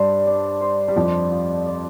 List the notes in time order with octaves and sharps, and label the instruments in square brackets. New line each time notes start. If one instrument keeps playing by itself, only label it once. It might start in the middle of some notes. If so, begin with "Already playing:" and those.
Already playing: [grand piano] G2 G3 [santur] D4 C5
[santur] D4
C5
[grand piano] G3
[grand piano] F2 F3 [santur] D5
[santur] F4
D5